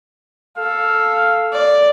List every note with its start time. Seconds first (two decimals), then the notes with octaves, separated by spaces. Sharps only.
0.57 A4 F5
1.53 D5